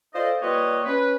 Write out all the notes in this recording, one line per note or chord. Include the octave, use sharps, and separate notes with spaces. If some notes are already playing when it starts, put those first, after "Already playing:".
F4 A4 C5 D5 D#5
G3 A#3 F4 B4 C#5 D#5
C#4 B4